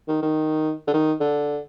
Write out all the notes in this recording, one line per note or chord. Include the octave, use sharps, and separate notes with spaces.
D#3
D#3
D3
D#3
D3